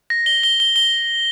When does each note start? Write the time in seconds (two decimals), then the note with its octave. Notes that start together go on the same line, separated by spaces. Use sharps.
0.10 A#6
0.26 G7
0.43 G7
0.60 G7
0.76 G7